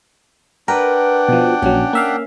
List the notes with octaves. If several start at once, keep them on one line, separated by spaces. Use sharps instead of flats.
D4 A#4 B4 F#5 G5
B2 F3
A#1 F#3 C#4
A#3 E5 F5